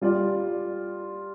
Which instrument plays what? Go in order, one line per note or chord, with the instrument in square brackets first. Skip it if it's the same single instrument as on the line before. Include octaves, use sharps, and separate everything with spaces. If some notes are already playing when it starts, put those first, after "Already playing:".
[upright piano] G3 F4 D5